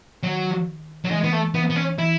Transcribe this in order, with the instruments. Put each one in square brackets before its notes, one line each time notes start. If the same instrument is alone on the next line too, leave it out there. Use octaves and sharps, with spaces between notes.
[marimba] D#3 [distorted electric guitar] F#3
[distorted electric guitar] F#3
[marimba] E3 [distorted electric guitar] G#3
[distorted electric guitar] B3
A3
[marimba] E3 [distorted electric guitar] B3
[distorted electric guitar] B3
C#4
[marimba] E3 [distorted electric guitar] E4